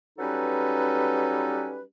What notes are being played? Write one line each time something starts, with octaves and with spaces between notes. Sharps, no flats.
F#3 G3 C#4 D#4 A4 B4